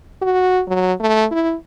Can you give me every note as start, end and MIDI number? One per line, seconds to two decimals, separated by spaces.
0.21 0.62 66
0.67 0.93 54
1.00 1.25 57
1.31 1.54 64